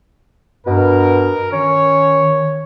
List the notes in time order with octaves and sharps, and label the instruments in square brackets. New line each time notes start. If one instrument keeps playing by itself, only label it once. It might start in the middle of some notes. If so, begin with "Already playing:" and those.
[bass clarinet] G2 [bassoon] B2 [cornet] A#4
[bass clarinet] D#3 [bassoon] C#4 [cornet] C#5